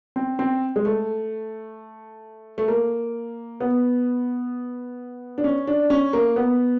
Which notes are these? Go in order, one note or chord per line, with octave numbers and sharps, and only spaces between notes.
C4
C4
G#3
A3
A3
A#3
B3
D4
C#4
D4
C#4
A#3
B3